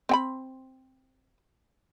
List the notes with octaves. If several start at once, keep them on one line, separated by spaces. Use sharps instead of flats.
C4 G5 B5